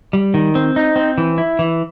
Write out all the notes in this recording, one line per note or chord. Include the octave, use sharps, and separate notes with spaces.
G3
D#3
C4
D#4
C4
E3
E4
E3